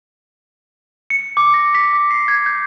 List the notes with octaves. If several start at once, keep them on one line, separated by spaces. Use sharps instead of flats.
C#7
D6
A#6
B6
D6
C7
G#6
G6